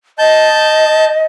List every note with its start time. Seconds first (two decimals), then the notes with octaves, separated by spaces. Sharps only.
0.19 D#5 A5 G6